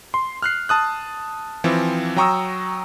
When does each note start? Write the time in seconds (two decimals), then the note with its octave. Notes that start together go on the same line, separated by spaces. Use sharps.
0.14 C6
0.42 F6 F#6 C7
0.69 A5 D#6 F#6
1.64 E3 F3 C4
2.16 F#3 G5 A#5 C#6 D#6 E6